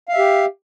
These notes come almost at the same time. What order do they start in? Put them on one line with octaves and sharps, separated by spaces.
F5 E5 G4